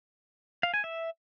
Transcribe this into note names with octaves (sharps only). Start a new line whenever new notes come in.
F5
G#5
E5